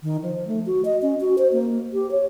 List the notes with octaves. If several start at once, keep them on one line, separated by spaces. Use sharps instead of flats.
D#3
F3
A3
F#4
D#5
C#4
F#4
C5
A#3
G4
C#5